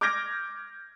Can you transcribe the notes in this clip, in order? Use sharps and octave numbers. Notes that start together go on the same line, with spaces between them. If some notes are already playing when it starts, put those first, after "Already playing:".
D6 F6 G6 G#6 A#6 D7